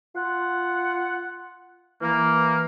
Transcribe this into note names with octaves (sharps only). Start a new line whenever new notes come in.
F4 F#5
E3 A#3